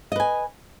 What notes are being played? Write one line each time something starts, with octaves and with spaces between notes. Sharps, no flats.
B4 D#5 G#5